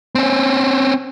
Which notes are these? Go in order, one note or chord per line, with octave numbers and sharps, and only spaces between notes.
C4 C#4